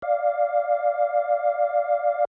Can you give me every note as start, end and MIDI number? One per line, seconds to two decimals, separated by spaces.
0.02 2.25 74
0.02 2.25 77